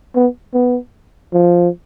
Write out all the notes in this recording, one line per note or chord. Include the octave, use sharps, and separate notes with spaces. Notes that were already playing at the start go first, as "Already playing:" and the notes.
B3
B3
F3